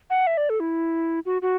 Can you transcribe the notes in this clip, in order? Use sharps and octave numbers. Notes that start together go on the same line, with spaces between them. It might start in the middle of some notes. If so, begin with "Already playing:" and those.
F#5
E5
D5
A4
E4
F#4
F#4